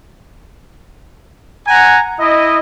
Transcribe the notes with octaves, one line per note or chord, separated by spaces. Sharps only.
F#5 G#5 A#5
E4 D#5